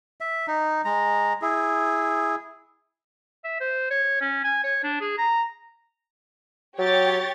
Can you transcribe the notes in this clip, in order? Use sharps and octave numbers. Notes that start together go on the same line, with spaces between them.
E5
D#4
G#3 A#5
E4 G#4
E5
C5
C#5
C#4
G#5
C#5
D4
G#4
A#5
F#3 G4 C#5 A6